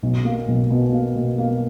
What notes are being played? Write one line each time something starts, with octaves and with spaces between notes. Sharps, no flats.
B1
A#3
B1
B2
A#3
B2
A#3